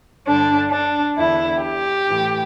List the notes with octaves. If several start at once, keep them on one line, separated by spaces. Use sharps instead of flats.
G2 D3 D4
D4
E2 D3 E4
G4
A2 E3